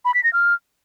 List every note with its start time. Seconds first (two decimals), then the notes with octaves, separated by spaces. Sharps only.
0.05 B5
0.14 B6
0.24 A#6
0.33 F6